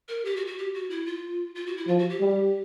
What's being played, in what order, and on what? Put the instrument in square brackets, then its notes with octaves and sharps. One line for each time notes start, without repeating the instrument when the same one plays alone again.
[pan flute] A#4
G4
F#4
F#4
G4
F#4
E4
F4
F4
F#4
E4
[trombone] F3 [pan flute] F4
[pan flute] F#4
G4
[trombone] G3